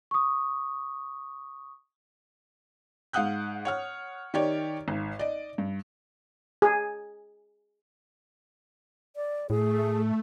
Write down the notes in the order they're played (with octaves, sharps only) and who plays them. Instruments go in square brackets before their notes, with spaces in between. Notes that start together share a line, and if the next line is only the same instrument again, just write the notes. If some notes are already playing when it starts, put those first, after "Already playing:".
[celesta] C#6 D#6
[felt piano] G#2 F5 F#5 D#6 F#6 G6
C#5 F#5 F6
D#3 G4 C#5 D5
G#1
D5 D#5
G2
[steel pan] G#4
[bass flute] D5
[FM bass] A2 [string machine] A3 [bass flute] G#4